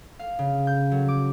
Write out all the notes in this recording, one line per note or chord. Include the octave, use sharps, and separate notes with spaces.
F5
C#3
G6
F#3
D6